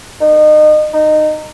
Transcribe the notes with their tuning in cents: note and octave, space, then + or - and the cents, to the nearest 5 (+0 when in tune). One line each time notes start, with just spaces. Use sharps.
D#4 -30
D#4 -20